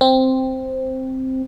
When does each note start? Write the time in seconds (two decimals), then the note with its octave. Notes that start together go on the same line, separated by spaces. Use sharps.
0.01 C4